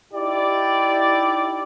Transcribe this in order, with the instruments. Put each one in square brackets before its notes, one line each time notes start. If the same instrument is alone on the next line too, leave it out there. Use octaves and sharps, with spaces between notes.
[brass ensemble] D#4 E4 G4 D5